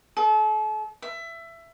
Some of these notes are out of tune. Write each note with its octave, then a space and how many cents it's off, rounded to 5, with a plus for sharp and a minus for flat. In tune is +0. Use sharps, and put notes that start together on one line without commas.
A4 -40
E5 +20